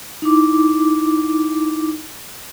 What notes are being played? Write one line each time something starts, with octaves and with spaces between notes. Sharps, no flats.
D#4 E4 D6